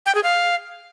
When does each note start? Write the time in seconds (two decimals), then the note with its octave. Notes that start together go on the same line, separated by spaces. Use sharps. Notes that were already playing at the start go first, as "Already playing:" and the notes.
0.06 G5
0.15 G#4
0.24 F5